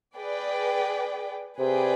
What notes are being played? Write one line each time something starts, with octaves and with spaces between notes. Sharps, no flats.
G#4 B4 D5 G5
C3 G#4 B4 D5 G5